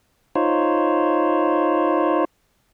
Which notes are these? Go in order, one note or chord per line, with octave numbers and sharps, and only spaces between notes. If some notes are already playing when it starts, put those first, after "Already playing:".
D#4 F4 C5 C#5